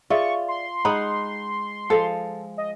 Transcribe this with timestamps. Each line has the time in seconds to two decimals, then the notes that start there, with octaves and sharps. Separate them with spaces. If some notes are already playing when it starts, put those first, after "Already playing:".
0.10 F4 G#4 D5 E5 C#6
0.48 C6
0.85 G#3 D#4 F#5 B5
1.90 F3 G#3 A4 F5
2.58 D#5